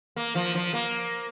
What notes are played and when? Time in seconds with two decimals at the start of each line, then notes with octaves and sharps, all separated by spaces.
0.16 A#3
0.35 F3
0.55 F3
0.74 A#3